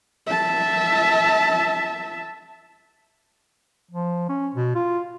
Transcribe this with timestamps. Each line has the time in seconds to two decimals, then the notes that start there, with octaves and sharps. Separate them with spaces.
0.27 E5 A5
3.91 F3
4.29 C#4
4.55 B2
4.75 F4